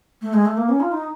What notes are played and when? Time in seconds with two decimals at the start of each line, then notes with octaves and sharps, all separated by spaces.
0.21 A3
0.33 G#3
0.45 A3
0.57 A#3
0.69 C#4
0.80 F4
0.92 D#4